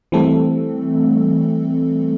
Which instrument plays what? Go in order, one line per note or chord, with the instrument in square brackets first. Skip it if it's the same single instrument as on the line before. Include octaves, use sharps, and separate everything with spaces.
[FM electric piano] E3 G3 A3 C4 A4